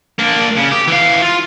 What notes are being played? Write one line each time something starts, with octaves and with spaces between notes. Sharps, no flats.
A#3 D4
C#3
G4
E3 F5
F4